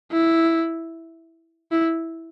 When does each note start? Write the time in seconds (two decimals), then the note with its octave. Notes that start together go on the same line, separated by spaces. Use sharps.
0.11 E4
1.71 E4